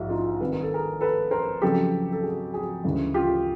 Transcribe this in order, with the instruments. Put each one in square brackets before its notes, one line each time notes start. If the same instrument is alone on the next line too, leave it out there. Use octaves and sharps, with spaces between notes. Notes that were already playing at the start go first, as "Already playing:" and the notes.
Already playing: [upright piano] A#1 G#2 E4 F#4
D#4 F4
C2 C3 D#3 B4
A#4
A4
G#4 A#4
A4 B4
A#4 C5
F2 C#3 F#3 G4 A4
A4
F#4 G#4
F#4 G#4
D2 C#3 E3 G#3
F4 G4